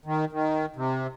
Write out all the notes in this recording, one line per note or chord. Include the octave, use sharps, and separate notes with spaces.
D#3
D#3
C3